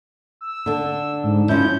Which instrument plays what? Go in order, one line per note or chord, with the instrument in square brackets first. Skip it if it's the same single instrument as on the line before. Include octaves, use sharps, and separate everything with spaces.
[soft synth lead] E6
[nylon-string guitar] D3 D4
[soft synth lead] G#2
[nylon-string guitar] F3 C#4 E4 [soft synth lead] G6